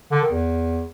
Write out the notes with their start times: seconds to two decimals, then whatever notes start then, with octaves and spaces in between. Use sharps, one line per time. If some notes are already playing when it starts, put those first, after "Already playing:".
0.11 D3
0.21 D#3
0.31 E2